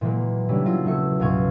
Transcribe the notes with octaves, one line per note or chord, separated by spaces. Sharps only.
A#2 E3 F#3 G#3 A#3
C#3 E3 G3 C#4 D4 E4
F#3 E4 F4
E1 F#3 A3 E5 C#7
C#2 G#2 B2 F5 G#5 C#6